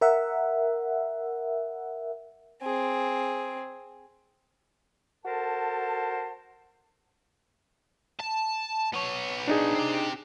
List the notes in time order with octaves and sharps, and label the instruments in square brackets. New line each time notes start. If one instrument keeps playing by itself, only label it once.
[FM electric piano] A#4 E5 F#5
[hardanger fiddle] C4 G#4
[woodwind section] F#4 A4 A#4 C5 A5
[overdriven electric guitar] A5
B3 C#5
[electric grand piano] D4 D#4 G#4
[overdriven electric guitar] C4 G4